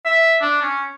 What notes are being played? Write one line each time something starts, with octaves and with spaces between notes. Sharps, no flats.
E5
D4
C#4